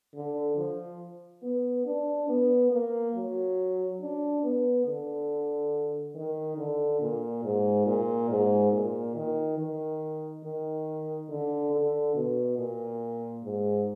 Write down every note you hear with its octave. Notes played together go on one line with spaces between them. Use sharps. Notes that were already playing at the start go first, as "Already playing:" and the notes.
D3
F3
B3
D4
B3
A#3
F#3
D4
B3
D3
D#3
D3
A#2
G#2
A#2
G#2
A#2
D#3
D#3
D#3
D3
D3
B2
A#2
G#2